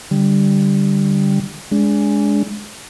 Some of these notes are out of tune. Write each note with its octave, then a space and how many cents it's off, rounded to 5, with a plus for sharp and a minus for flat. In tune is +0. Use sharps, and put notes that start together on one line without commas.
D3 +0 G3 +0
G#3 +0 D4 -30